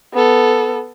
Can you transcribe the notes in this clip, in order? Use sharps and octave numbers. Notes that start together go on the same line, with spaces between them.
B3 A4